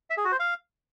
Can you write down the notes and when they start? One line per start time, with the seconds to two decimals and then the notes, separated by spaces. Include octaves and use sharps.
0.10 E5
0.17 G#4
0.25 F#4
0.32 C5
0.39 F5